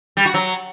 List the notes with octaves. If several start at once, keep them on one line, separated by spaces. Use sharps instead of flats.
G3
F#4
F#3